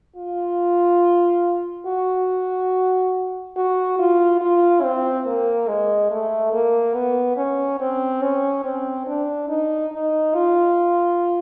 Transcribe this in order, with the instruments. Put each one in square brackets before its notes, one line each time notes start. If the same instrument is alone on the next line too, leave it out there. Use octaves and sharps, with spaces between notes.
[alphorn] F4
F#4
F#4
F4
F4
C4
A#3
G#3
A3
A#3
B3
C#4
C4
C#4
C4
D4
D#4
D#4
F4